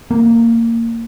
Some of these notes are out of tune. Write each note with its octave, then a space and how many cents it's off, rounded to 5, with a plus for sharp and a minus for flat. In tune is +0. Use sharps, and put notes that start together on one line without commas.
A#3 -20